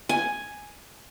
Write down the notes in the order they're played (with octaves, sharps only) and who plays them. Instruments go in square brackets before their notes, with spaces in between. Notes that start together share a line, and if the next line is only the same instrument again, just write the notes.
[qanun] G#5